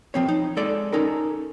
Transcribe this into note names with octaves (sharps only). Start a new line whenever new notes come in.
F3 C4 C#5
D#4
G#3 A4 D5
C#4 D#4 A4 A#4